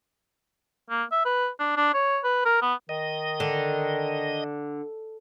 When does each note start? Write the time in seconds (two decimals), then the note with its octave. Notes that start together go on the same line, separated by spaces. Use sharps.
0.90 A#3
1.12 E5
1.25 B4
1.59 D4
1.77 D4
1.94 C#5
2.24 B4
2.45 A#4
2.62 B3
2.89 D#3 D#5
3.40 D3